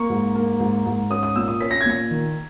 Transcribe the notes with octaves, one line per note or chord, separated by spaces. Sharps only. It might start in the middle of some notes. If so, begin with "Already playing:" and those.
Already playing: A#3 C#6
G#2
A#3
G#2
G#2
C#4 D#6
D#6
A#2 E6
D#6
C#4 B6
A#6
G#6
A#2 A#6
D#3